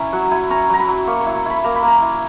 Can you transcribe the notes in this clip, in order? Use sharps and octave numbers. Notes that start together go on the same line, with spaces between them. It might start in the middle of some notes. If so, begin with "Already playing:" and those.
Already playing: C#4 E4 E5 A#5 C#6
F#3 F#5
E4 G#5
C#4 A#5
F#3 A#5
B5
F#3
A#3 C#6
C#6
E4
C#6
E4 B5
A#3 A#5
B5
A#3
A#5
E4